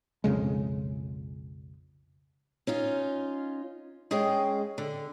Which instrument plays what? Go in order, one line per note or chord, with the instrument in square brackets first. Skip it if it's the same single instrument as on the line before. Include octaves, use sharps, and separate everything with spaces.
[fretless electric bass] B1 F2 C#3 G#3
[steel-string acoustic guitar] C#4 D#4 F4
G#3 C#4 G#4 D#5 F5 G5
D3